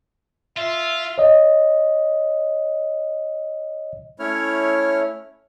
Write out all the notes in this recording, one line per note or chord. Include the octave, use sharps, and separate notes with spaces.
F4 E5
C#5 D#5
A3 C#4 E4 C#5 F6